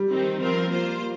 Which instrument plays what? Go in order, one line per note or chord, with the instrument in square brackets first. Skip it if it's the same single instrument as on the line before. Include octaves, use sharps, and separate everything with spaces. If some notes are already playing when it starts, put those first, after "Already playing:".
Already playing: [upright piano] G3
[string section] D#3 C4 D#4
F3 C4 F4 A#4
A#3 F4 C5